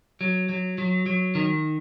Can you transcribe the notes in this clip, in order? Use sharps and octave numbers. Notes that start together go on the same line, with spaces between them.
F#3
F#3
F#3
F#3
D#3